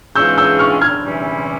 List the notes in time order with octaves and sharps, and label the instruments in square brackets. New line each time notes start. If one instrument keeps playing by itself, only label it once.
[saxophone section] G#2 E3 G#3 C#4 F4 [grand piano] E6 G6
[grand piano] E6 G6
C#6 F6
F6 G#6
[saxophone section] C3 E3 G3 C#4 E4